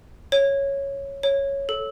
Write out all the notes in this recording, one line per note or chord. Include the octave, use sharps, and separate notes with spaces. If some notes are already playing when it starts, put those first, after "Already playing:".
C#5
C#5
A4